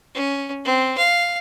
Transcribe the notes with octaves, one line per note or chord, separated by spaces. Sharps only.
C#4
C4
F5